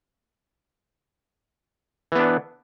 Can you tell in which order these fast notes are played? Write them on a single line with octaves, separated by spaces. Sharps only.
E3 B3 D4